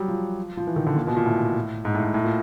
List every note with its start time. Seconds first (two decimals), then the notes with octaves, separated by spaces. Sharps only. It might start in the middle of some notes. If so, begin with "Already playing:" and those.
Already playing: F#3 G3
0.08 F3
0.57 F3
0.67 E3
0.76 D#3
0.87 D3
0.96 A#2
1.07 B2
1.16 A#2
1.26 A2
1.85 G#2
1.94 A2
2.05 G#2
2.14 A2
2.24 A#2